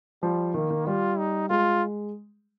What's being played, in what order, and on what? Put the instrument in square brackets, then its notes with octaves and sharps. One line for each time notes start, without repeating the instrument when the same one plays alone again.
[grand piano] F3 [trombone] G3
[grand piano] D#3 [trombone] A#3
[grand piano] D#3
[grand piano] G3 [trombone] F4
[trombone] D#4
[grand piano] G#3 [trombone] F4